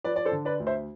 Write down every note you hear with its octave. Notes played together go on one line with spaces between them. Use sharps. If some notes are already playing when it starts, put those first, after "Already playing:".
F3 B4 D5
D5
A4 C5
D3
B4 D5
D2
C5 E5